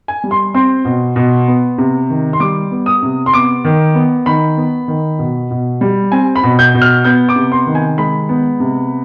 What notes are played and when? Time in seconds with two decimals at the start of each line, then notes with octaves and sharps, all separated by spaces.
0.08 G#5
0.24 G3
0.31 C6
0.54 C4 C6
0.85 B2
1.16 B2
1.48 B3
1.78 C3
2.10 D#3
2.33 C6
2.40 G3 D6
2.71 B3
2.86 D#6
3.03 C3
3.26 C6
3.33 B3 D6
3.65 D#3
3.95 B3
4.26 D#3 B5
4.57 B3
4.88 D#3
5.19 B2
5.51 B2
5.81 G3
6.12 C4 G#5
6.36 B5
6.43 B2
6.59 G6
6.74 B2
6.82 F6
7.05 B3 G6
7.29 D6
7.36 C3
7.52 C6
7.67 D#3
7.75 G#5
7.98 G#3 B5
8.29 B3
8.60 C3